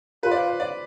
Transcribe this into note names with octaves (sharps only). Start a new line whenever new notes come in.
F4 B4
D5
C5
C5
D5